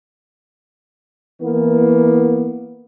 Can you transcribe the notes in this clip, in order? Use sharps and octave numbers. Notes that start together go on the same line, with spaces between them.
E3 A#3 B3